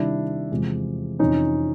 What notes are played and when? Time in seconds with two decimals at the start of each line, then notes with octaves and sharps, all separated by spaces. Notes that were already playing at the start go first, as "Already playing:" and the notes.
Already playing: C3 D#3 G3 D4 E4
0.51 E2 C3 F3 G#3
1.19 F2 C3 E3 C#4 D#4